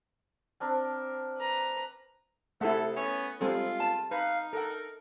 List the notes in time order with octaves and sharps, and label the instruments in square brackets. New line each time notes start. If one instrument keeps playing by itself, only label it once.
[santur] C4 D4 A#4
[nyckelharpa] B4 A#5
[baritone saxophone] C3 [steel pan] A3 E4 [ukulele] G#4 F#5 [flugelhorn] A4
[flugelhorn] B3 [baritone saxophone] C#4
[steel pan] G3 C4 A4 [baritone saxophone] G#3 [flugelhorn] F4
[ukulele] A5
[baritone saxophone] D#4 [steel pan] B4 [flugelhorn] F5
[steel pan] A4 F#5 [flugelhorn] A#4